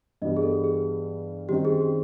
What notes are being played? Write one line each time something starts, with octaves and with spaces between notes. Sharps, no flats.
G2 E3 G3 B3 D#5
G#4
A4
G#4
F#2 D#3 G3 C4 D#4 G4
G#4
G4